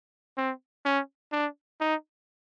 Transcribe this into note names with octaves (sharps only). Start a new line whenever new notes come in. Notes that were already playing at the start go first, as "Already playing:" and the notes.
C4
C#4
D4
D#4